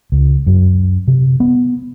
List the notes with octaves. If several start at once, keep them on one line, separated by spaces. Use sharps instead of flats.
C#2
F#2
C3
B3